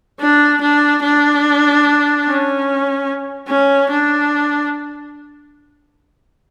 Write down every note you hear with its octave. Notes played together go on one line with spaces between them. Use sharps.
D4
D4
D4
C#4
C#4
D4